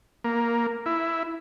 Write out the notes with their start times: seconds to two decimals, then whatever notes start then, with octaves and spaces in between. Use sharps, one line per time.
0.24 A#3
0.86 E4